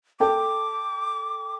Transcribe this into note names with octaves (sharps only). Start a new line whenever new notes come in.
A4 G5 A5 D6